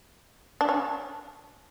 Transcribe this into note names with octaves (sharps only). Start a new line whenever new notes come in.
D4
C#4